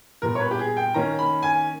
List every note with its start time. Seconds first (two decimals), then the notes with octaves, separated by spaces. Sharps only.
0.22 A#2 G3 B3 A#4
0.35 C#5
0.40 B4
0.51 G4
0.59 G#4
0.77 G5
0.94 D#3 A#3 C#4 A#5
1.19 B5
1.43 G#5